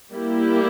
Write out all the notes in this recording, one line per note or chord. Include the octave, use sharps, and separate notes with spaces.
G3 A#3 E4 G4